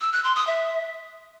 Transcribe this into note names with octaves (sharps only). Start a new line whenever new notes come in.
E6
F#6
C6
D#6
E5